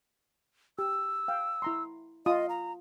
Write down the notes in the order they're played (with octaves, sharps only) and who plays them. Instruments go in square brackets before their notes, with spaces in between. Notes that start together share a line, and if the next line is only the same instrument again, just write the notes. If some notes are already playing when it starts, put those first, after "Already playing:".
[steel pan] G4 [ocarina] E6
[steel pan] F5 G5
E4 A#5 C6
[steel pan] F4 D#6 [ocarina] D#5
[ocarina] A#5